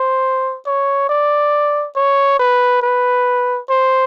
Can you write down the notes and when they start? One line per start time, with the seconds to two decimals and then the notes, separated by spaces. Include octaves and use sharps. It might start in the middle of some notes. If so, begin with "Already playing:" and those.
Already playing: C5
0.66 C#5
1.09 D5
1.96 C#5
2.39 B4
2.82 B4
3.69 C5